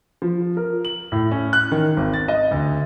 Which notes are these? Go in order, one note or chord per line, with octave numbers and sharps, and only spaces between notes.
F3
A#4
F#7
A2
C#4
F#6
D#3
G#1
A6
D#5
D2